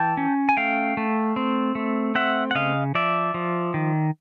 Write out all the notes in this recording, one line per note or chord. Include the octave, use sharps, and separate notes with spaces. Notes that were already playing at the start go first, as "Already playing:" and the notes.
Already playing: E3 G5 A5
C#4
G#5
A3 F5 G5
A3
C4
A3
C4 E5 F#5
F#5
C#3 D#5 F5
F3 D5 E5
F3
D#3